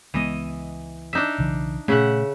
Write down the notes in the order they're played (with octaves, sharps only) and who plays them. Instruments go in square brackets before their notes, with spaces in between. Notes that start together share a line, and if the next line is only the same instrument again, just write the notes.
[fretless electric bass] C#2 G#3 B3 [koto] E3 D#5
[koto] D4 D#4 E5
[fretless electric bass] B1 C#3 E3
[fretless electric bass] A#2 A3 [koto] C#3 E5 F#5